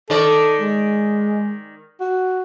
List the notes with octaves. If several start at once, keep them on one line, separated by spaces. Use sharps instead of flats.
D#3 A4 D5
G#3
F#4